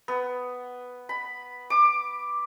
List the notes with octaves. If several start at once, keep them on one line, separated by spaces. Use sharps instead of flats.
B3
B5
D6